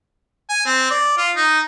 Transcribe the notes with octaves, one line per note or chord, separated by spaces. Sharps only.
G#5
C4
D5
F4
D#4